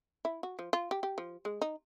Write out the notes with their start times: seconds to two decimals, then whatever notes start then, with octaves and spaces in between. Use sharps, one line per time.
0.25 E4
0.43 F#4
0.59 F3
0.73 F4
0.91 G4
1.03 G4
1.18 F3
1.45 G#3
1.62 D#4